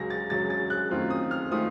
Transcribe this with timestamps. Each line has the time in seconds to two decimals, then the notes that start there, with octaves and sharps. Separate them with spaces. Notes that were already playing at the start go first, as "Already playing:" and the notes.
Already playing: C#2 C#3 F#3 A#6
0.10 A6
0.30 C#2 C#3 F#3 A6
0.50 A6
0.70 F#6
0.91 F#2 D#3 A3 C4 F4
1.10 D#6
1.31 F6
1.51 D#3 A3 C4 F4 D#6